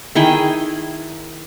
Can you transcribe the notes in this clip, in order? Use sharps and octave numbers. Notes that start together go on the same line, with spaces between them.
D#3 E4 G#4 G5